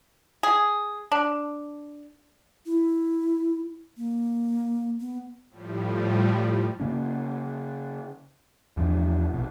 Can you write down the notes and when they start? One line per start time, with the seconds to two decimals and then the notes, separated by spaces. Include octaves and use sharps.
0.43 G#4
1.12 D4
2.66 E4
3.97 A#3
5.00 B3
5.50 A2 F3 G3
6.80 C#3 A#3 C#4
8.77 E2 F3 D4
9.33 A#1 B2